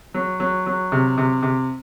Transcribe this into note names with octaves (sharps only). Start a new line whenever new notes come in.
F#3
F#3
F#3
C3
C3
C3